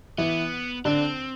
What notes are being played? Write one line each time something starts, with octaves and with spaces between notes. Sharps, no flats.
E3 B3 E4
D3 C4 D4